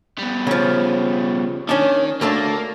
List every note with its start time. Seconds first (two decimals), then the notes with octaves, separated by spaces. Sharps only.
0.19 B2 G3
0.47 C#3 F3
1.69 D#3 C#4 D4
2.21 D2 A3 A#3 D4